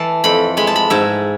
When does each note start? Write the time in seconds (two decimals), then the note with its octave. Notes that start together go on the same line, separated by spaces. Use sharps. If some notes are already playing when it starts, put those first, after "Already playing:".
Already playing: E3 A5
0.24 F2 B5
0.57 G#3 B5
0.67 A5
0.76 B5
0.90 G#2 E5